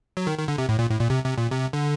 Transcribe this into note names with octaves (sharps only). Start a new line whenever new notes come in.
F#3
D#3
D#3
D3
C3
A2
A#2
A2
A#2
C3
C3
A#2
C3
D3